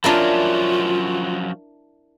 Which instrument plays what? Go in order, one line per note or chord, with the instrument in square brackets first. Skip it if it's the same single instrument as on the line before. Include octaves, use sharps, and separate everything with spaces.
[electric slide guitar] F3 F#3 C#4 [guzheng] D4 E4 A#4 [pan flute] F4